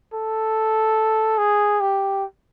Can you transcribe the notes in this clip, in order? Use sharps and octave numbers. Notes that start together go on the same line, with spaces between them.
A4
G#4
G4